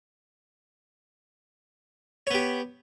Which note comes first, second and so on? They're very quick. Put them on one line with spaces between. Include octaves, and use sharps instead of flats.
C#5 B3 G4